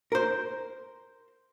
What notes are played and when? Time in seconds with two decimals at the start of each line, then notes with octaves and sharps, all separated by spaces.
0.12 A#4 C5